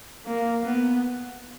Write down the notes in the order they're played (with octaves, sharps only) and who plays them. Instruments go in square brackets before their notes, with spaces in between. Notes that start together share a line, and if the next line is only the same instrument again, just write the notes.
[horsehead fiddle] A#3
B3